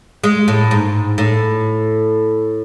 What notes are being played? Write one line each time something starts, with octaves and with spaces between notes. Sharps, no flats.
G#3
A2
G#2
A2